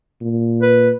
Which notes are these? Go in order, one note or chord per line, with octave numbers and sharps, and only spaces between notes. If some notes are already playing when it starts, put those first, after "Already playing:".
A#2
B4